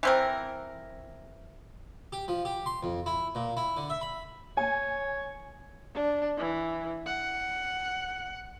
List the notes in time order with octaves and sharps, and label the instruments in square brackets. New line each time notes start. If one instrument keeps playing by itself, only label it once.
[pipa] E3 C4 A#4
[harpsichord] G4
F3
G4
C6
F2
E4
A#2
E4
D3
E5
B5
[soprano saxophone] C#5 [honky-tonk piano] G#5
[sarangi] D4
E3
F#5